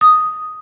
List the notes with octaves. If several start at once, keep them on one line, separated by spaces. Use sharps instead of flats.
D#6